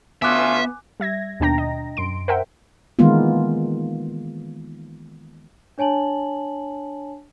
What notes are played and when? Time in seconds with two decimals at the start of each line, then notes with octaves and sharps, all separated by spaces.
0.22 D2 B3 C#4 F4 E5 G#5 D6 F#6
1.00 G3 E5 G#6 A#6
1.40 D#2 B2 D4 G5 A#5 A#6
1.58 D#5
1.97 F#2 C6 D7
2.28 A#4 C5 E5 F#5 G5
2.99 D#3 E3 G#3 A#3 B3 F4
5.78 D4 C#5 G#5 A5 F#7